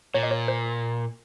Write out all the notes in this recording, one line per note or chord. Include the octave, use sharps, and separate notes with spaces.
A#2 C#5
D#5
C#5
C5